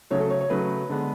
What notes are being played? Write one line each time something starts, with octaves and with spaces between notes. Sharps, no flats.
C#3 F#3 A3 C#5
A4
C#5
C#5
C#3 F#3 A3 B4
D3 G#3 B3